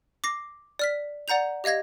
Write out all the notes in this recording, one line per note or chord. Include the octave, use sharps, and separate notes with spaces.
D6 A#6 C7
D5 F6 B6
D5 F#5 A#5 G6 F7
G4 D#5 F5 G#6 A#6